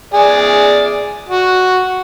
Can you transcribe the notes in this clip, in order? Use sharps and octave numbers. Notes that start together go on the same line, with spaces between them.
G#4 D5
F#4